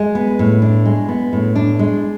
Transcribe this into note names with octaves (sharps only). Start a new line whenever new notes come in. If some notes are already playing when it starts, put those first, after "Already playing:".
Already playing: G#3
B3
A2
D4
G#3
B3
A2
D4
G#3